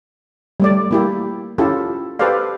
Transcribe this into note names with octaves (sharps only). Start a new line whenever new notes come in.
G3 A3 D5
A#3 E4 G4
C#4 E4 F4 G4 A4
G4 A4 B4 C5 D5 F5